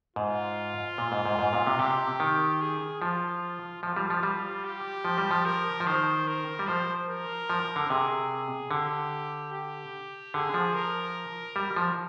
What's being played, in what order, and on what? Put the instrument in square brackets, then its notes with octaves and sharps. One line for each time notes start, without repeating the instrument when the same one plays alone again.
[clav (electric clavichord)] G#2 [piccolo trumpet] F4
[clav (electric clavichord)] A#2
G#2
G#2
G#2
A#2
C3
[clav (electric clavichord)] C3 [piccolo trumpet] G4
[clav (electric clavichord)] D#3
[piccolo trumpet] G#4
[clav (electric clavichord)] F3 [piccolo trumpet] F4
[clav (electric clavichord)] F3 [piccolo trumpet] F4
[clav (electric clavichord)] G3
F3
G3
[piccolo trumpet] G4
[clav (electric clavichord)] F3
G3
F3
[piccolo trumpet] A#4
[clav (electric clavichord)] F3
[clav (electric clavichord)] D#3 [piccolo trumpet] C5
[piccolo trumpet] A#4
[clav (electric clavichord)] G3
[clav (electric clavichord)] F3 [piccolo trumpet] C5
[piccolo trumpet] A#4
[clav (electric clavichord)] F3
D3
[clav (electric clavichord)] C3 [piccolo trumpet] G#4
[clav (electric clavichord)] D3 [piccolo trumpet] G4
[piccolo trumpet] G4
[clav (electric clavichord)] D3 [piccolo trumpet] G#4
[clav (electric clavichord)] F3
[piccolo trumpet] A#4
[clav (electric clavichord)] G3
F3